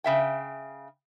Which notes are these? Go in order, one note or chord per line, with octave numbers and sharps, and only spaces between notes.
C#3 E5 G5